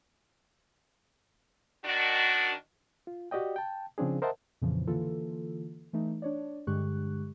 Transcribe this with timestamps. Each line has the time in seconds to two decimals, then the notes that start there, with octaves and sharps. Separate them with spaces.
1.85 D#3 D4 F#4
3.07 F4
3.31 F#4 G4 D5 D#5 G5
3.56 G5 A5
3.98 C#3 F3 C4 D4 G#4
4.22 A#4 C5 D#5 E5 F#5 A5
4.62 F2 A#2 C#3 E3 F3
4.87 D3 E3 A#3 F4 A4
5.93 E3 A3 D#4
6.22 D4 C#5 D5
6.67 G2 D3 G#3 G4 C#6 F#6